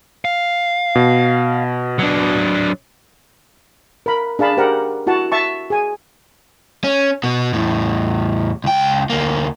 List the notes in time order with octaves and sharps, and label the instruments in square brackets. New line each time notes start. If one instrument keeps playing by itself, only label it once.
[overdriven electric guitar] F5
[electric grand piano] B2
[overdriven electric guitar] F#3 D4
[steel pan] A#4 B5
D4 G#4 F5 A5 B5
G4 A#4 C5 F#5
E4 F#4 F#5 A5
E5 A5 C#6
G#4 G#5
[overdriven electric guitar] C#4
B2 B3
E2 A2
C#2 G5
D2 A#3